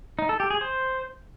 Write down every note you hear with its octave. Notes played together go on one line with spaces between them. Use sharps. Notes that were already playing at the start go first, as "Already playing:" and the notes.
D#4
A4
G4
G#4
C5